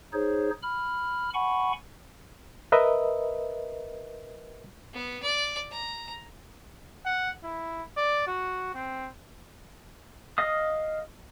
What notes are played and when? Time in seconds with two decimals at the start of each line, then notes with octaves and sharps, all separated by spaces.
0.13 D#4 G#4 C5 C#5
0.62 B5 F6
1.34 F#5 G#5 B5 C#6
2.72 A#4 B4 D#5 E5
4.93 B3
5.22 D5
5.71 A#5
7.05 F#5
7.43 E4
7.97 D5
8.27 F#4
8.74 C4
10.38 D#5 F5 D#6